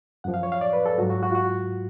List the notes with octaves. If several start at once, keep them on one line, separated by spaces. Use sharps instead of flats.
F#2 F3 F#5
F5
C#5
F5
D5
B4
A4
G#2 F#3 F#4
F#4
F#4
F4
F#4